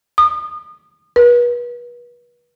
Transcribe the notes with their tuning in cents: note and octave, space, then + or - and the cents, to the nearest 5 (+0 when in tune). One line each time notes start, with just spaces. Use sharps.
D#6 -35
B4 -35